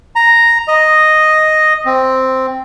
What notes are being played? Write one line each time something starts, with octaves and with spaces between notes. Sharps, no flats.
A#5
D#5
C4